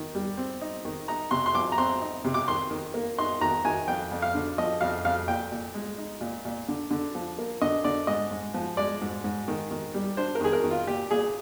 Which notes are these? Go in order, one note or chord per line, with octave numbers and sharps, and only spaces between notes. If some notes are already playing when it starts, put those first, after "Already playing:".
Already playing: D#3
G3
C4
D#4
D#3
D#4 A#5
C3 C6
C6
F3 D6
A#5
C4 C6
D#4
C3
D6
D#3 C6
D#3
A#3
D#4 C6
D#3 A#5
D#3 G#5
F2 G5
F2
F5
D3
F3 D#5
F2 F5
F2 F5
A#2 G5
A#2
G#3
D#4
A#2
A#2
D3
D3
F3
A#3
D3 D#5
D3 D5
G#2 D#5
G#2
F3
G#3 D5
G#2
G#2
D#3
D#3
G3
D4 C5
A#4
D#3 G#4
A#4
D#3
F4
A#2 G4
A#2 G#4